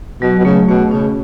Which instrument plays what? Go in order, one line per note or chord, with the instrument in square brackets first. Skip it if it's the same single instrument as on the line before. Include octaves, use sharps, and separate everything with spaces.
[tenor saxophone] B2 [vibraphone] F#3
[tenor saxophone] B2
[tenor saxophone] C#3 [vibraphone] A3
[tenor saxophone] B2 [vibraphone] A3
[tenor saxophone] C#3 [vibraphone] C#4